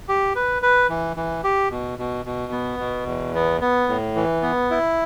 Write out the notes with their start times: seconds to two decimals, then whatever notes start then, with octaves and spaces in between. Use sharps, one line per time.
0.09 G4
0.35 B4
0.62 B4
0.89 E3
1.16 E3
1.44 G4
1.71 B2
1.99 B2
2.26 B2
2.52 B3
2.79 B2
3.07 E2
3.35 B3
3.61 B3
3.88 A2
4.16 E3
4.42 B3
4.71 E4